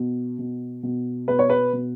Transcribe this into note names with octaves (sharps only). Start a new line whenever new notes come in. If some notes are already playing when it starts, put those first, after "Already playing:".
Already playing: B2
B2
B2
B2 B4
C#5
B4
B2